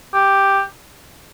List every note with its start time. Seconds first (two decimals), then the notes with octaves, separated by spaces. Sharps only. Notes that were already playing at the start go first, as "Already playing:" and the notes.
0.14 G4